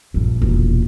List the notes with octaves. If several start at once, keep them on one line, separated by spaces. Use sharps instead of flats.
A#1 G2
E1 A#2